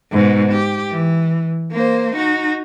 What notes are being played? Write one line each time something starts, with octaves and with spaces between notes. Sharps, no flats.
G#2 B2
G4
E3
A#3 C5
D#4 F#4